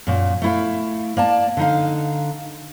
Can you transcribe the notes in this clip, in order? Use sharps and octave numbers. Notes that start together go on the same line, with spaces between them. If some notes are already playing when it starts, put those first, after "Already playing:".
F#2 A#2
A3 E4 F5
A#3 D5 A5
D3 D#4 F5